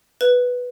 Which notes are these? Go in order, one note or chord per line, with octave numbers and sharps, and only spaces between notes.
B4